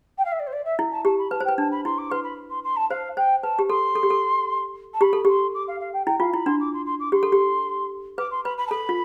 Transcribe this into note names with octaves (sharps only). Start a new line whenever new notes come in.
G5
F5
E5
D5
C5
D5
E5
E4
A5
G4 A5
B5
B4 A5
C5
B4 G5
D4 A5
B5
E4 C6
D6
B4 C6
B5
C6
C6
A5
C5 F5
C5 G5
B4 A5
G4
A4 C6
A4
G4
A4
A5
G4 B5
A4
G4 C6
D6
F5
F5
G5
E4 G5
F4 F5
E4 B5
D4 C6
D6
C6
C6
D6
G4 C6
A4
G4
B4 D6
C6
B4 B5
B5
A5
A4 B5
F4